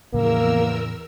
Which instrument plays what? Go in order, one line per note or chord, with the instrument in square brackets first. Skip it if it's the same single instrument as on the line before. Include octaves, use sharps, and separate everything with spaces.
[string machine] E2 A#4 E6 [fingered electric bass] A2 C#3 F3 [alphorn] A#3